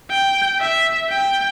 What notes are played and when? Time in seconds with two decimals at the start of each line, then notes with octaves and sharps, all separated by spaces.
0.10 G5
0.60 E5
1.10 G5